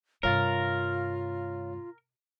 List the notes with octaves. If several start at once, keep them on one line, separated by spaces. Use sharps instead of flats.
G2 C3 F4 A#4 C#5 F5 A6